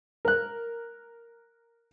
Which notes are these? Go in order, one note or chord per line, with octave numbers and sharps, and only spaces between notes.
A#4 F#6